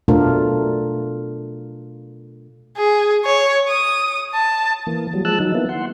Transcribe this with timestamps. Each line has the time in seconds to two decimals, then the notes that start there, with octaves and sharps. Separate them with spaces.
0.08 B2 A3 D4 F4 A#4
2.77 G#4
3.25 C#5
3.68 D#6
4.34 A5
4.87 E3 A#3
5.13 F#3 G3
5.25 F3 G#3 A5 E6 F#6
5.40 D#3 F#3 D#4
5.54 A#3 B3 E4
5.69 F#5 C6